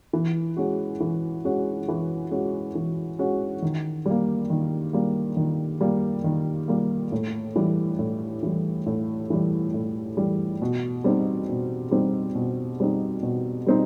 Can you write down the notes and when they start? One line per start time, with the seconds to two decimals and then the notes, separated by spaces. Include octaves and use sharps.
0.13 E3
0.57 G#3 C#4 F#4
1.00 E3
1.45 G#3 C#4 F#4
1.88 E3
2.31 G#3 C#4 F#4
2.75 E3
3.19 G#3 C#4 F#4
3.62 D#3
4.06 G3 A#3
4.50 D#3
4.93 G3 A#3
5.37 D#3
5.81 G3 A#3
6.24 D#3
6.68 G3 A#3
7.12 A2
7.56 E3 G3
7.99 A2
8.43 E3 G3
8.86 A2
9.30 E3 G3
9.74 A2
10.17 E3 G3
10.62 B2
11.04 G3 C4 D#4
11.49 B2
11.91 G3 C4 D#4
12.35 B2
12.80 G3 C4 D#4
13.23 B2
13.67 G3 C4 D#4